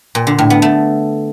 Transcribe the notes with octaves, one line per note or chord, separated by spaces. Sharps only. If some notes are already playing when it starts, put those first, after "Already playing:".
A#2
D3
A2
B3
A3